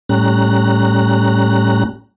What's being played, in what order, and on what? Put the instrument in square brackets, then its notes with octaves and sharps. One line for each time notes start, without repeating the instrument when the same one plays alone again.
[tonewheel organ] A2 G3 C#4 A#5 F#6